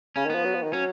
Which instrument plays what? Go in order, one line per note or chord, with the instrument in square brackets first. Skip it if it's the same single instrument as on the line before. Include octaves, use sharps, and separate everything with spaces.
[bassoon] C#3 [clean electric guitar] C#4
[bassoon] D#3
[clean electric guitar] B3
[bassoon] F3
F#3
F3
D#3
[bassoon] F#3 [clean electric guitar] C#4